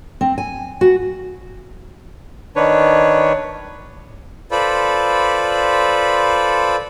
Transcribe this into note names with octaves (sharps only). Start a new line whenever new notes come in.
C4
G#5
F#4
D#3 D4 B4 C#5
F4 A4 B4 C5 D5 B5